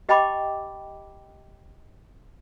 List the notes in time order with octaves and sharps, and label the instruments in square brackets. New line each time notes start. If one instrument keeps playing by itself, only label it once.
[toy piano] G4 D#5 G5 A5 B5 D6